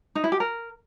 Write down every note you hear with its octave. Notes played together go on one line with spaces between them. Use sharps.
D#4
E4
G4
A#4